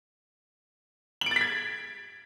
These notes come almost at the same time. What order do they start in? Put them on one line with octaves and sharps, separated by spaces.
F#7 D7 A6 B6 G#6